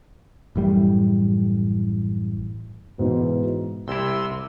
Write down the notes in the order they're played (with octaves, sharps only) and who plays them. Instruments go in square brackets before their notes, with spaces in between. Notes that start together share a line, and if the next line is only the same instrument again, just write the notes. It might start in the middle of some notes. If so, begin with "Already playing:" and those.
[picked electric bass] A1 F#2 A2 G3
[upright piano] G#2 E3 [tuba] B2
[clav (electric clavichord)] C2 E4 [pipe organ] C3 C6 E6